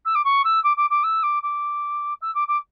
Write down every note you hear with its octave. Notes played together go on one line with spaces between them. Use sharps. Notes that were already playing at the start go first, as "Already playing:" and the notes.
E6
D6
C#6
E6
D6
D6
D6
E6
D6
D6
E6
D6
D6